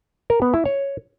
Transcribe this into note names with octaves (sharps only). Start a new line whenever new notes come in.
A#4
B3
E4
C#5